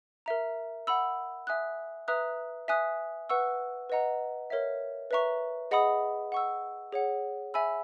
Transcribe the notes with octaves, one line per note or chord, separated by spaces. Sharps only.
A#4 E5 A#5
F#5 B5 E6
E5 G#5 D#6 F#6
B4 E5 A#5 D#6 F#6
E5 G#5 D#6 F#6
B4 F#5 C#6 E6
B4 D#5 F#5 A#5
A#4 C#5 E5
B4 E5 A#5 C#6
G#4 D#5 F#5 B5 D#6
F#5 C#6 E6
G#4 C#5 F#5
E5 G#5 B5 E6